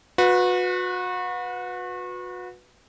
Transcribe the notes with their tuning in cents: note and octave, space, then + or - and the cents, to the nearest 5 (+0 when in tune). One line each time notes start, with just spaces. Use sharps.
F#4 -35 B4 +0